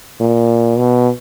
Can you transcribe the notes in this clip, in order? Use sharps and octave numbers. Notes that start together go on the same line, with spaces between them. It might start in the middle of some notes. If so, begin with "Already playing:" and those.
A#2
B2